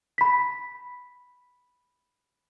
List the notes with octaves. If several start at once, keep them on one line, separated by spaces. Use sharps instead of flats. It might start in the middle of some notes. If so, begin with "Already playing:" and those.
B5 B6